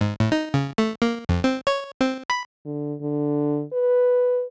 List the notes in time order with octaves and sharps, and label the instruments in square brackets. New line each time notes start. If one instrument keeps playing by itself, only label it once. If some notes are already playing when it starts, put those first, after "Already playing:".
[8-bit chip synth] G#2
A2
D#4
C#3
A3
A#3
F2
C4
C#5
C4
B5
[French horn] D3
D3
B4